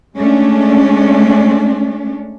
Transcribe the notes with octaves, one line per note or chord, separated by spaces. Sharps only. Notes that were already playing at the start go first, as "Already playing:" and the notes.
G#3 A3 C#4 D4